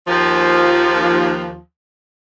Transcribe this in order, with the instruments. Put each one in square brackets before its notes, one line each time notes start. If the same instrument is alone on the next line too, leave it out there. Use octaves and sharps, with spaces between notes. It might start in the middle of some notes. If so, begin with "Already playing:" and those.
[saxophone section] D#2 F3